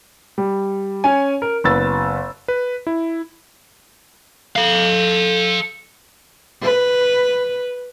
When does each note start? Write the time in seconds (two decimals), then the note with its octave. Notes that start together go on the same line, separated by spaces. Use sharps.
0.38 G3
1.04 C#4 C#5 G#5
1.42 A#4
1.64 F#1 B3 E6 A6
2.48 B4
2.87 E4
4.56 A4 F5
6.63 B4